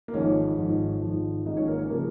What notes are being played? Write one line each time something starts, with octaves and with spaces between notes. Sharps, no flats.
A#3
G#1 G#2 F3 C#4
G#1 G#2 F3
G#1 G#2 F3
G#1 G#2 F3 D#4 D#5
C#4 C#5
A#3 A#4
C#4 C#5
C#3 F3 A#3 A#4